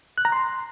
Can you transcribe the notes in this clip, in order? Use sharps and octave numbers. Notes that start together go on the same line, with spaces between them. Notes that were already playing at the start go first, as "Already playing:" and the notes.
F#6
A#5
C6